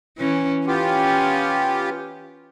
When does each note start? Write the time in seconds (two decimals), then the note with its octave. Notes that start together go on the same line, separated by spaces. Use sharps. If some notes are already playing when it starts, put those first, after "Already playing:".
0.18 E3 C#4
0.67 B3 C#4 F4 G4